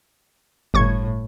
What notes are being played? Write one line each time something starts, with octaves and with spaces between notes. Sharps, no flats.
G1 A2 C#6 G#6